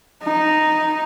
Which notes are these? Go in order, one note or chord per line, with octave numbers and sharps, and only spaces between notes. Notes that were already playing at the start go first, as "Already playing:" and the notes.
D#4